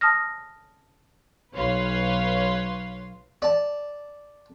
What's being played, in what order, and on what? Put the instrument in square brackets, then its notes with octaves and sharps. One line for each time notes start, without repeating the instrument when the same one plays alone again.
[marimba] A5 D#6 F6 A#6
[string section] B1 B4 C#5 F5 C6
[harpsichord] D5 A5